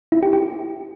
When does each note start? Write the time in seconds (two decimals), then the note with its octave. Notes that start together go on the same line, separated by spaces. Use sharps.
0.12 E4
0.23 G4
0.33 G4